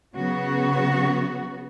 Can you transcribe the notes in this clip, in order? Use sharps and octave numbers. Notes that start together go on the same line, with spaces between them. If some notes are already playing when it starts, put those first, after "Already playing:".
C#3 F#3 B3 F#4